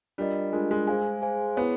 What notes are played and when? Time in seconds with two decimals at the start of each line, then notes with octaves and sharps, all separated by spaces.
0.18 G3 D4 F4 A#4 D#5
0.53 G#3 D4 F4 A#4 D#5
0.71 G#3
0.87 G#3 G#4 C5 F5 G#5
1.22 G#4 C5 F5 G#5
1.57 B3 E4 G#4 C#5